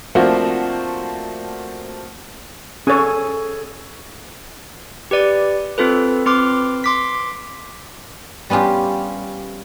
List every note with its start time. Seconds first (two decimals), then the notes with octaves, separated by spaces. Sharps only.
0.15 F3 A3 A#3 C4 D4 F#4
2.87 C#4 G#4 A4 C#5
5.11 G4 B4 D5
5.78 C4 F4 A4 B4
6.26 C4 B4 C6 D6 F6
6.84 C6 D6 B6
8.50 G3 B3 C#4 F4 G4